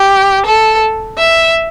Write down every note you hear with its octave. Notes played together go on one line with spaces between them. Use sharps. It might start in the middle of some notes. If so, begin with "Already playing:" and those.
Already playing: G4
A4
E5